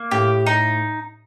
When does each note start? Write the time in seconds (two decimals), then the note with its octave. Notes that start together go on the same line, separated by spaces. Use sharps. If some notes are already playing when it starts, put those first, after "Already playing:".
Already playing: A#3
0.11 A2 G4
0.46 D#4